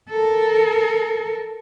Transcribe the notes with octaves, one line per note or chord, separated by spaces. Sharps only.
A4 A#4